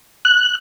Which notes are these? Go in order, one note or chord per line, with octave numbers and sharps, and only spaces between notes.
F#6